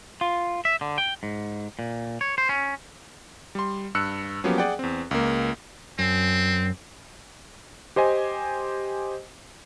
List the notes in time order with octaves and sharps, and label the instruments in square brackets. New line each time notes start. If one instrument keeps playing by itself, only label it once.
[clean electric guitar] F4
E5
D3
G5
G#2
A#2
C#5
C5
C#4
[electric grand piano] G3 C6
G2 E6 F#6 C#7
F3 F#3 A#3 B3 C#4 G4
G#4 D5 F#5 G5
E2 C4
C#2 A#3
[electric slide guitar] F#2 [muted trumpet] C4
[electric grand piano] G4 C5 D#5 G#5